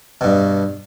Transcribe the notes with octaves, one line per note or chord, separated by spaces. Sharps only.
G2 B2